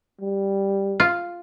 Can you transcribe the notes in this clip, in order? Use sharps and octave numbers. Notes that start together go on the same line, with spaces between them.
G3
F4